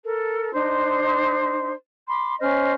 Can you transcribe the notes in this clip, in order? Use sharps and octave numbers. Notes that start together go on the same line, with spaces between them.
A4 A#4
D4 D#4 C5 C6
B5 C6 D6
C#4 C5 D#5 F6